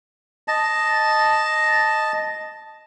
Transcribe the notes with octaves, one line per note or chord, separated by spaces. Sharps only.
D#5 A5